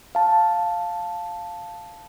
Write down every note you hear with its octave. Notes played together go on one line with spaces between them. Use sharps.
F5 A5